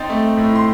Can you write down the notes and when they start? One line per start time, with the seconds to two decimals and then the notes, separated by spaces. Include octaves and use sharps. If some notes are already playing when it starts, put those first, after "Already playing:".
Already playing: C4 D#4 A6
0.09 A3
0.37 A2
0.55 C6